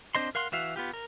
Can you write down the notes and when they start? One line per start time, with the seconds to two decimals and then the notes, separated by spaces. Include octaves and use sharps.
0.15 C4 D4 C5 D#5 C6
0.35 A#4 F5 F#5 C6
0.52 E3 F#4 E5 F5
0.76 B3 F4 G4
0.94 A#4